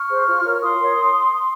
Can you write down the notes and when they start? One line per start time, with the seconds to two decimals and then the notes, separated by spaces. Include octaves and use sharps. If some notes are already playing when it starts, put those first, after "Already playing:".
Already playing: C#6 F6
0.10 G#4 C5
0.27 F4
0.44 A#4 C#5
0.61 F4 C6 D#6
0.79 A#4 C#5